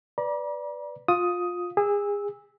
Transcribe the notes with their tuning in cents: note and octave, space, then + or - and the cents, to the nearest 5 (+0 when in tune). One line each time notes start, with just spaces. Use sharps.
B4 +0 D5 +0 A#5 +45
F4 +20 D#6 +10
G#4 -30 E6 -15